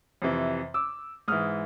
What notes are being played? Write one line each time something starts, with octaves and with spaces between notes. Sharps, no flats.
F2 C3 E3
D6 E6
G#2 E3 D#6 F6